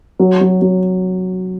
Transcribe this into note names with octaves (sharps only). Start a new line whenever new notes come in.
F#3
F#3
F#3